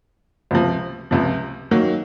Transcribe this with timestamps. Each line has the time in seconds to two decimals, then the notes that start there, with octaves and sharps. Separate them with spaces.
0.51 C#2 C3 F3
1.11 C#2 C3 F3
1.71 D#3 F#3 A#3